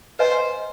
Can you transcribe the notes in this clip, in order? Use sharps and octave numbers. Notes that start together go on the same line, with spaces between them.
B4 C5 D#5 G#5